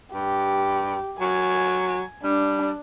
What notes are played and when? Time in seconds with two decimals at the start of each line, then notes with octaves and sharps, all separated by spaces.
0.14 G2 G4
1.21 F#3 G#5
2.24 G3 D4